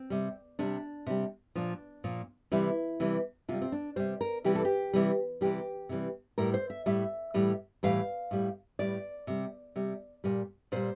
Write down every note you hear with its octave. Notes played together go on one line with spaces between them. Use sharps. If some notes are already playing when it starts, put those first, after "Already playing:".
Already playing: C4
C3 G3
C3 G3 D4
C3 G3
A#2 F3 D4
A#2 F3
C3 E3 G3 E4
C3 E3 G3
C3 G3 F4
C4
D4
C3 G3 C5
A#4
C3 E3 G3 G4
A4
G4
C3 E3 G3
C3 E3 G3 G4
C3 E3 G3
A2 G3 A#4
C5
E5
A2 G3 E5
A2 E3 G3
A2 E3 G3 F5
A2 G3
A2 G3 D5
C3 G3
C3 G3
A#2 G3
A#2 G3 C5